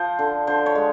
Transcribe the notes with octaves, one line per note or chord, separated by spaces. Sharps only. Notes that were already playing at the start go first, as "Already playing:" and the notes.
Already playing: F3 C5
D3
D3 C5
C#5
G#3